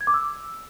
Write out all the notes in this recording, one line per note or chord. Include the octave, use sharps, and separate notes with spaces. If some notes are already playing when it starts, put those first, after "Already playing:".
G#6
D6
E6